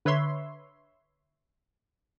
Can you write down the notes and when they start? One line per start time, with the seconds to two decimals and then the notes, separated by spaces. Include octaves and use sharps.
0.05 D3 B4 C#5 E5 C6